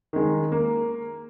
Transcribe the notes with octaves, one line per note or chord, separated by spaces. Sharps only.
D#3 G#3
A#3